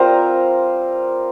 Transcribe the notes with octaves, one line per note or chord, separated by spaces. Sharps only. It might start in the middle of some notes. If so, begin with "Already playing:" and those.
Already playing: G3 C4 F4 A#4 C5